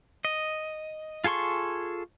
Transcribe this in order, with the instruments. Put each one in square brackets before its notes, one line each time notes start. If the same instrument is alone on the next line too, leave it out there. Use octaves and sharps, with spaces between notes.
[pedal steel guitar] D#5
F4 G#4 A4 C6 C#6